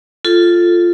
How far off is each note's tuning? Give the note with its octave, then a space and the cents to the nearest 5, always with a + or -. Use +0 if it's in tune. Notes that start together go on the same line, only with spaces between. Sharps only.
F4 -5 A4 +0